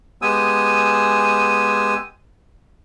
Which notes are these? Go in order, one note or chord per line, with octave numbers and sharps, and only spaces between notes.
G#3 B3 G4 G#5 D#6 E6